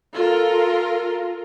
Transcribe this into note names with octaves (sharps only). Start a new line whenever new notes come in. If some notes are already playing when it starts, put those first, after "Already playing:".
F4 A4 A#4